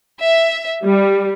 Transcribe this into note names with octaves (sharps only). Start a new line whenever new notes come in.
E5
G3